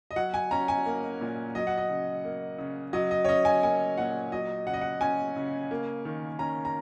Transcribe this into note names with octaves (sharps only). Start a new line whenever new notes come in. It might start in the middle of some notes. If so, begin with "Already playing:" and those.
D#5
F#3 F#5
G#5
C#4 A#5
G#5
A#3
A#2
F#3 D#5
F#5
D#5
C#3
A#3
C#3
F#3 D#5
D#5
C#5
C#4 D#5
G#5
A#3 G#5
A#2 F#5
F#3 D#5
C#3 F#5
D#5
F#5
C#4 G#5
C#3
A#3
D#3
C#4 A#5
A#5